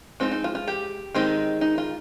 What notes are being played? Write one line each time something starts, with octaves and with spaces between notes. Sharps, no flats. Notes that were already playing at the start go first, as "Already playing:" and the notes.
G#3 C4 D#4 F4
D#4
F4
F4
G4
D#3 G#3 C4 D#4
D#4
F4